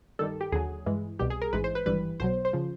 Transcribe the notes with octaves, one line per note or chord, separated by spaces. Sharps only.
G2 D#3 G3 A4
G4
D#2 D3 F#3 G#4
G2 E3 G#3
C2 B2 G3 G4
G#4
A#4
A1 G#2 E3 G#3 B4
C5
B4
G#1 G2 E3 G3 B4
B1 B2 F#3 C5
C5
C#3 F3